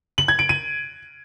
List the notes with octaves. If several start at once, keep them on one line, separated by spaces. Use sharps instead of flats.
F#7
G#6
D7
D#7